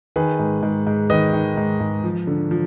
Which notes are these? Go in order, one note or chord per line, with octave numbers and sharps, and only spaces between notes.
D#3 G#4 B4
G#2
G#2
G#2
D#3 B4 D#5
D#3
G#2
G#2
F3
D3
F3